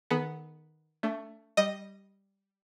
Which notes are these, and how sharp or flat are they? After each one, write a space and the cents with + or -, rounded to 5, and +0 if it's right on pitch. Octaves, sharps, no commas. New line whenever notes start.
D#3 +0 B3 +0 A4 -45
A3 +15 D4 -35
G3 +0 D#5 +0